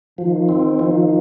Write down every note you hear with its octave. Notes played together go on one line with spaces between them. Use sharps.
D#3 F3
C4
F3